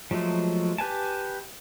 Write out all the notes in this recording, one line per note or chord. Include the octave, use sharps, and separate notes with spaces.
F3 F#3 G#3 A3
G4 B4 G#5 A5